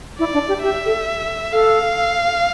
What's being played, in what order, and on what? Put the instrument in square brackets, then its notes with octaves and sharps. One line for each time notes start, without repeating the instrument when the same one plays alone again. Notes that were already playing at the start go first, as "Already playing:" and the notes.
[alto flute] E4 [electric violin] D5
[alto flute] D4
G4
[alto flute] G4 [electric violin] E5
[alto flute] A4
[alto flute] A4 [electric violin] F5